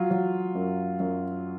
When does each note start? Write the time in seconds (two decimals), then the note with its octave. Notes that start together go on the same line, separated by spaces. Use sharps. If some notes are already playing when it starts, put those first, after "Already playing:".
Already playing: F#3 F4
0.11 F#3
0.55 F#2
1.00 F#2